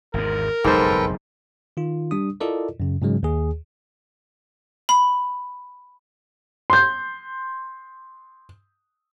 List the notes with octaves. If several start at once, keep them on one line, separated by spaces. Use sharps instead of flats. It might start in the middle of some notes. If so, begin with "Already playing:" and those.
G#1 E2 G#2 A#4
F#1 B1 F2 G#2 A4 B4 C5 G5
D#3 F4
G3 D4 D#6
E4 F4 A4 A#4 D5 D#5
F#2 C#3
G#2 C#3 F#3 G#3
D#2 G#4
B5
C6 G6